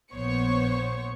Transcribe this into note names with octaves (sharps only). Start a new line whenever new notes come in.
A#1 B3 C5 C#5 C#6